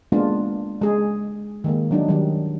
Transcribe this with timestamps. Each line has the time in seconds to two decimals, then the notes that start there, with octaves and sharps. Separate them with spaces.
0.12 G#3 A#3 B3 D4 F4
0.82 G#3 G#4
1.64 D#3 G#3 A#3
1.91 F#3 D4 D#4
2.08 D#3 F#3 G3